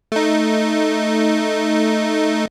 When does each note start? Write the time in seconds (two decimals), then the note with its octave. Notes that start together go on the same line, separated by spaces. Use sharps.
0.12 A3 D#4